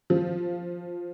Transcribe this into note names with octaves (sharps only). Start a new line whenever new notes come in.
F3